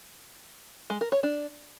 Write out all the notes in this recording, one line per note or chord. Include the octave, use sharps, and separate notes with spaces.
G#3
A#4
C#5
D4